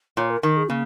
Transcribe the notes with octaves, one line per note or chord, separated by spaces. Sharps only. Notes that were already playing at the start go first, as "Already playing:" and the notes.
A#2 C#5
A#4
D#3 A#4
G#4
C#3 A#3